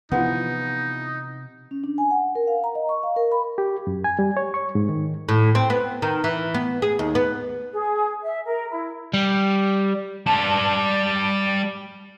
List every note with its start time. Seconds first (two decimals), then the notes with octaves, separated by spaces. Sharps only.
0.12 C3 E3 F3 B3 D#4 F#5
1.71 C#4
1.84 D4
1.98 G#5
2.11 F#5
2.35 A#4
2.47 F5
2.64 A#5
2.75 D#5
2.89 C#6
3.03 F5
3.16 A#4
3.32 B5
3.58 G4
3.87 F#2
4.04 G#5
4.19 G3
4.37 C#5
4.54 C#6
4.75 G#2
4.89 D#3
5.29 A2
5.55 C4
5.70 B3
6.02 D#3
6.24 E3
6.54 B3
6.82 G#4
6.99 D#2
7.15 B3
7.72 G#4
8.22 E5
8.45 A#4
8.71 E4
9.14 G3
10.26 G3 A5